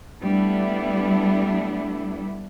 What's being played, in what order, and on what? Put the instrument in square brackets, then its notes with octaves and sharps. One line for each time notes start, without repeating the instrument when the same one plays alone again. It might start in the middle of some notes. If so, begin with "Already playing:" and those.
[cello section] G3 A3 B3 D4 E4